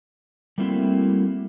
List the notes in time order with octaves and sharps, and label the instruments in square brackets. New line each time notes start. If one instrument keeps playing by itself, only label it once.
[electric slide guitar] G3 A3 A#3 C4 E4 F#4